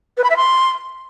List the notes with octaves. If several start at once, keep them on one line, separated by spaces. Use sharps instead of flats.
B4
B5
E5
C6